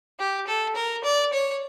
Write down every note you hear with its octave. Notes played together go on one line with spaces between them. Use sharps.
G4
A4
A#4
D5
C#5